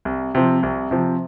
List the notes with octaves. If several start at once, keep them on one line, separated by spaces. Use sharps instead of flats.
C2
C3 F3
C2
C3 F3